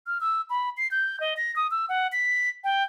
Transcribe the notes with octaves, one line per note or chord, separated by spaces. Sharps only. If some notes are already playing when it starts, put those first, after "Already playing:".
F6
E6
B5
C7
G6
D#5
A#6
D#6
E6
F#5
B6
G5